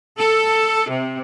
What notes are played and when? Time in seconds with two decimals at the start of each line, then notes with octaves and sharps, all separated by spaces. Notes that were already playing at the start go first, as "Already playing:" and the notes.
0.19 A4
0.90 C3